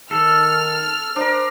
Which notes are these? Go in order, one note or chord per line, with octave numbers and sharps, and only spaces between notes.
D#3 A4 F6
D4 A#4 C5